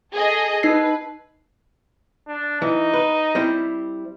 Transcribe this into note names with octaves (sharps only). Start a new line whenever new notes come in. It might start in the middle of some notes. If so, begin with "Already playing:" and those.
G#4 A4 D#5
D#4 B4 C7
D4
E3 D#4
B4
G3 C4 E4